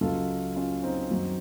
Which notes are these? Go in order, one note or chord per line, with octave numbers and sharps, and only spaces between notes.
C#2 C#3 F#3 F4 A4
C#4 F4
C4 D#4
F#2 D#3 F#3